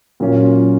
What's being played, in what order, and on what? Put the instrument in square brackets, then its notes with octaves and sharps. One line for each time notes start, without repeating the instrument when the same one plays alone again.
[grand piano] A#2 F#3 A#3 C#4 F4